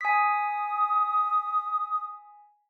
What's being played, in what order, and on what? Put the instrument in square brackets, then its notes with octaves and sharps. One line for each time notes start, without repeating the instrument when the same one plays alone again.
[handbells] G#5 B6 [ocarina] D#6